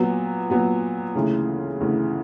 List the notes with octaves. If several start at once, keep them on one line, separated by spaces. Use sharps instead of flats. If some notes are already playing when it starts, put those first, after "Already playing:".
Already playing: A#2 F#3 B3
A#2 F#3 B3
D2 C#3 E3
D2 C#3 E3